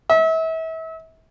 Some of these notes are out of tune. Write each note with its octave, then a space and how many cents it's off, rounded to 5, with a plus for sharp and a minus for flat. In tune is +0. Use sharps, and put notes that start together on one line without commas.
E5 -35